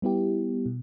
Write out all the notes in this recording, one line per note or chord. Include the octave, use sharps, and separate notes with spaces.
G3 B3 E4 G4
B2